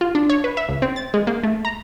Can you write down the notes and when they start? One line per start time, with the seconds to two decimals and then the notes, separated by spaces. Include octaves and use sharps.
0.01 F4
0.15 D4
0.29 C#5
0.44 B4
0.57 E5
0.69 C#2
0.82 C4
0.96 A6
1.14 G#3
1.27 A#3
1.43 A3
1.65 A#5